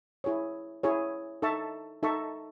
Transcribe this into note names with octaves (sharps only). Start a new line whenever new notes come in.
E4 G#4 C#5
E4 G#4 C#5
D#4 A4 E5 A5 C#6
D#4 A4 E5 A5 C#6